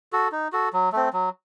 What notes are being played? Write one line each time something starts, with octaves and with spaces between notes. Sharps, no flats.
F#4 A4
D#4
F#4 A4
F#3
A3 C4
F#3